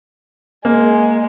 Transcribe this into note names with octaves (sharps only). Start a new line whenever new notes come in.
G#3 A#3